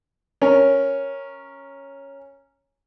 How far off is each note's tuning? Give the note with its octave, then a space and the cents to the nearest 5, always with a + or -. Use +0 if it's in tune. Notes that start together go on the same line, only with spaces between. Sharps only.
C#4 -5 A#4 +0